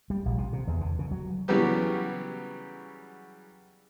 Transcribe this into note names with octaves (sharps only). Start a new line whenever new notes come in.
G3
A#1
C3
C3
E2
D3
C#3
F#3
C#3 E3 F#3 G3 B3 G4